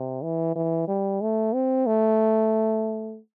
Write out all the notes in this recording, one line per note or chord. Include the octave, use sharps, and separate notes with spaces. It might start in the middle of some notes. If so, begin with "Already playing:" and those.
Already playing: C3
E3
E3
G3
A3
C4
A3